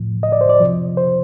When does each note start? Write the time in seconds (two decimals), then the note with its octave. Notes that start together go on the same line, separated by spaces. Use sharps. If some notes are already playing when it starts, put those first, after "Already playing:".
Already playing: A2 F3
0.23 D#5
0.32 D5
0.41 C5
0.49 D5
0.60 C3 F3
0.97 C5